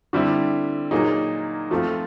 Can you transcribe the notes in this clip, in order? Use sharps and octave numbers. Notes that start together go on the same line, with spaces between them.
D3 G3 C4 E4
A#2 F#3 A#3 D#4 G#4
F3 A3 C4 F4